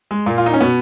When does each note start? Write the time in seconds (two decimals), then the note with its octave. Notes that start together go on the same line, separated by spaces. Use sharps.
0.11 G#3
0.26 A#2 A#3
0.38 F4
0.46 D#4
0.53 C#4
0.60 B2 B3